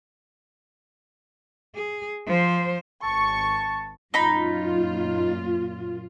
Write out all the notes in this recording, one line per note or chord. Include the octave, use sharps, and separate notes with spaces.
G#4
F3 C5
G#1 A5 C#6
F#2 A#2 D#4 F4 B5